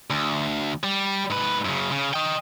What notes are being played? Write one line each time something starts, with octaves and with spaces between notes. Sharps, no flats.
D2
G3
G#2 B4
F#2 C#3
C#3
D#5 G5